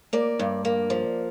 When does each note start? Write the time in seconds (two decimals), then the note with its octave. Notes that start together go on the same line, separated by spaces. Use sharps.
0.13 A#3 D5
0.39 G2
0.65 A#3
0.90 F3